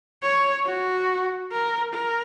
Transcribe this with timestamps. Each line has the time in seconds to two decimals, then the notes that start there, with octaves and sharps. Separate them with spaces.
0.22 C#5
0.65 F#4
1.52 A#4
1.94 A#4